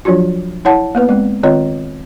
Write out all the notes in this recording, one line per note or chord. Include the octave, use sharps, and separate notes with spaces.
F3 F#3 D4 F4 F#4
E4 C#5 F#5 A5
A#3 B3 B4
G#3 C4
D#3 C4 F4 C#5 D#5